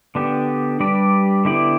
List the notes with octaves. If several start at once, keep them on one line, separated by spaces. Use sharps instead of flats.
D3 B3 D4 G4
G3 D4 G4 B4 D5
D3 B3 E4 G4 D5